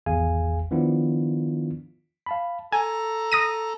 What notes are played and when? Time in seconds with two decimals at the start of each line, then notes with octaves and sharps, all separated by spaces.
0.06 G#1 E2 G#4 F5 G#5
0.71 D#3 F3 B3 D4 E4 F4
2.26 F5 A5 B5
2.72 A4 G#5 A#5
3.32 D#6 A#6 D#7